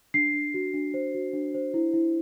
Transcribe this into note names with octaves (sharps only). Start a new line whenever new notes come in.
D4 C7
D4
F#4
D4
C5
F#4
D4
C5
E4
E4